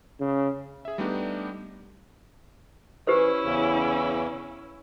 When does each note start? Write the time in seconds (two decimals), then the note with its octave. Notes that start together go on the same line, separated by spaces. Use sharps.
0.20 C#3
0.85 G#4 E5
0.98 G3 A3 B3 D4 D#4 G4
3.07 E3 C#4 E4 G4 B4 C5
3.44 E2 C#3 E3